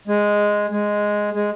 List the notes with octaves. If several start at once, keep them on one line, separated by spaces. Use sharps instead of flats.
G#3
G#3
G#3